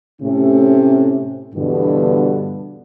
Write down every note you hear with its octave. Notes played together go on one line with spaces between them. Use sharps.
A2 C3 A3 C#4
G2 B2 D3 E3 B3